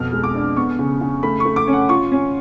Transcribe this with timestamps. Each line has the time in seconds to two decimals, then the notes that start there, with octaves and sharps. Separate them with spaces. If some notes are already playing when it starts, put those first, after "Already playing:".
Already playing: F2 B2 F6
0.13 G#3
0.24 D6
0.35 D4
0.57 B3 C#6
0.79 C#3
1.01 C#3
1.23 A3 B5
1.40 C#6
1.45 A3
1.56 D6
1.67 C#4
1.73 F#5
1.89 F4 C#6
2.12 C#4